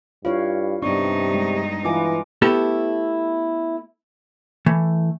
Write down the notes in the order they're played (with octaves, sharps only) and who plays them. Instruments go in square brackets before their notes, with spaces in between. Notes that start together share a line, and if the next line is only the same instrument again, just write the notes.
[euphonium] G2 [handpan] E4 C#5 F5 [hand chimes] F4
[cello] G2 D#4 [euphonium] C3 [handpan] B3 D4 [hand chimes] C#6
[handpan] G#3
[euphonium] E3 [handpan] F4 B4 [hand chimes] G#5 D6
[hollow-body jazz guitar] A3 B3 E4 G4 A4
E3 A3